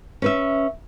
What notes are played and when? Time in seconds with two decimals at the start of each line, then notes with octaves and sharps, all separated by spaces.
0.22 C#4 B4 E5